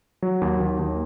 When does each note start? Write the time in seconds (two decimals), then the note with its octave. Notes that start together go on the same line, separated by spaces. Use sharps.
0.22 F#3
0.41 D#2
0.60 D#2
0.79 D#2